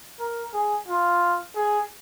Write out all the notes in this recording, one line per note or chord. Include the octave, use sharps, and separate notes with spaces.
A#4
G#4
F4
G#4